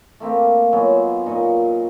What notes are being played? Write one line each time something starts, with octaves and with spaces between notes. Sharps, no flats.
A3 A#3 C4 G4
F#3 G#3 B3 F4
A#2 D#4 D#5 C#6